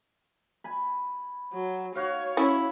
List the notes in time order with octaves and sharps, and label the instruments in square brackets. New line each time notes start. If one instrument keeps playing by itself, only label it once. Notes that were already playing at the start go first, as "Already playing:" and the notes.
[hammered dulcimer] G#5 B5
[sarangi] F#3
[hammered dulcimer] F#4 F5 [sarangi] C#5
[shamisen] C#4 [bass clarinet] E4